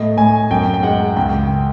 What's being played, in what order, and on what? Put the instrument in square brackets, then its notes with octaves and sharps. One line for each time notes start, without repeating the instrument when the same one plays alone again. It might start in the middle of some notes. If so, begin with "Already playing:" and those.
Already playing: [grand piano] A2 D#5
A2 G#5
F#2 G5
G5
G#3 F#5
C#2 G5